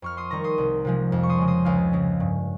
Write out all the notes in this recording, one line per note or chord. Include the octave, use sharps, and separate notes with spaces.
F2 C#6 F6
C6 D#6
D#3 G3 A#5 C#6
C6 D#6
C2
C3 F3 G#3
F2
C#6
C6 D#6
C#3 G#3
C6 D#6
C#2 F5 G#5
C#3 G#3
G2